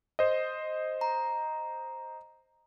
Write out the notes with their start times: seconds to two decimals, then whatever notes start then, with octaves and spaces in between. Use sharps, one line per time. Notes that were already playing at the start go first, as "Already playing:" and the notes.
0.19 C5 D#5
1.01 A#5